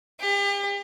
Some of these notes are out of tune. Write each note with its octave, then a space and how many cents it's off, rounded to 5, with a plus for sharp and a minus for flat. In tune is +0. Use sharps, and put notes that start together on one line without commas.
G4 +40